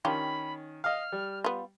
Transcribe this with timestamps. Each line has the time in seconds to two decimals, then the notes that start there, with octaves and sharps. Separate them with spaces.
0.05 D#3 C#4 D4 F4 G4 B5
0.84 D#5 F5 F6
1.12 G3
1.44 B3 F4